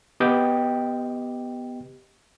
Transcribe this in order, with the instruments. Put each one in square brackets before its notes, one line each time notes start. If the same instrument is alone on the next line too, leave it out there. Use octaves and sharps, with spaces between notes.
[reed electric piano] B3 G4 D#5 G5